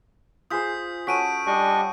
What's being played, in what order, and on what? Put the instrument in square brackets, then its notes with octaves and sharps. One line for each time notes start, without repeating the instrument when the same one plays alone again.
[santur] F4 G#4 C5 [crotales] D#6 G6 B6
[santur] C#4 F#4 A4 [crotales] B6 D7 D#7
[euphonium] G3 [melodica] D4 D#5 C#6